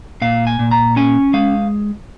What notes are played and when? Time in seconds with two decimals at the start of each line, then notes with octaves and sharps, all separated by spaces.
0.21 A#2 F5
0.47 G#5
0.59 A#2
0.71 A#5
0.96 C#4 G#5
1.34 G#3 F5